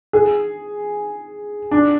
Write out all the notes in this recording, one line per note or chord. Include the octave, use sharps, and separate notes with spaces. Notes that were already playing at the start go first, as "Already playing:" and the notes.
G#4
D4